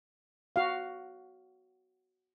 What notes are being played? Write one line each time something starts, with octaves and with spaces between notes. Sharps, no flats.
F#4 F5